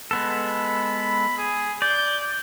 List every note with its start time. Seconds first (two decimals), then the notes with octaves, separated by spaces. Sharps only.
0.11 G#3 B3 A4 B5
1.38 G#4
1.82 D5 G6